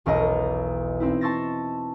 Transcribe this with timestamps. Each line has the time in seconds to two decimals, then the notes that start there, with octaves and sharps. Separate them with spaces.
0.06 E1 B1 A#4 D#5 A#5
1.00 C4 D#4 E4
1.21 A5 C6 C#6 E6 A6 A#6